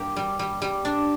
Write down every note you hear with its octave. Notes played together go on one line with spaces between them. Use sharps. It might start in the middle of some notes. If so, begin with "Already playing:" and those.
Already playing: G2 A#3 G4
G3
G3
G3
D4